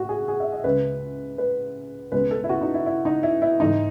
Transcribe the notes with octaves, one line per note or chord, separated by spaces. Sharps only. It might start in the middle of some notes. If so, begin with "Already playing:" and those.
Already playing: A2 F#4
G#4
G#4
E5
D#5
C#2 C#3 G#3 B4
B4
C#2 B2 G#3 B4
A4
E4
F#4
D#4
E4
E4
D#4
E4
E4
G#2 E3 A3 D#4